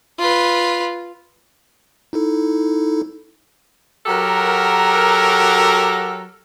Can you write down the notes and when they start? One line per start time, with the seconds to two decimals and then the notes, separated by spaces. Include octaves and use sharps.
0.19 F4 B4
2.13 D#4 E4 A4
4.06 F#3 F#4 G4 A4 A#4